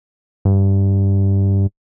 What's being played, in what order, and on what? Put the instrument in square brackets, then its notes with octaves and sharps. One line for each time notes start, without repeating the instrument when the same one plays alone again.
[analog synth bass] G2